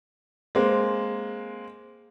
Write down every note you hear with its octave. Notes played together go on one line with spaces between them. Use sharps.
G#3 A#3 C4